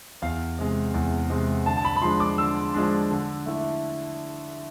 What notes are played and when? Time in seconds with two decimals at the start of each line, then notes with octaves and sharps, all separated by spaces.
0.22 E2 F5
0.59 C3 G#3
0.94 E2
1.30 C3 G#3
1.66 D3 A5
1.77 A5
1.85 B5
1.96 B5
2.02 F3 G#3 D4 C6
2.20 D6
2.38 D3 E6
2.74 F3 G#3 D4
3.11 D3
3.46 A3 E4